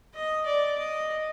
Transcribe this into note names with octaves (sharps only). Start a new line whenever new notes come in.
D#5
D5
D#5